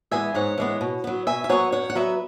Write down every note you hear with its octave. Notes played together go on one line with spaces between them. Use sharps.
E3 G#3 B3 E5 G#5
G#2 C#5 F#5
E3 G#3 B3
B2
F#3 B3
B2 E5 G#5
E5
F#3 B3 C#5 F#5
F#2 C#5 F#5
F#5
F#3 B3 B4 E5